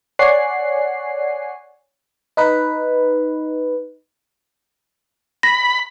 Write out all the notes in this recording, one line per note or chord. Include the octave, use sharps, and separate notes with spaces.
C#5 D5 F#5 G#5 C7
D#4 B4
B5 A#6